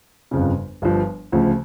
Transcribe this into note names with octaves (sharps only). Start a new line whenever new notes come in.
G1 F2 C#3
G1 G2 F3
D2 C#3 F3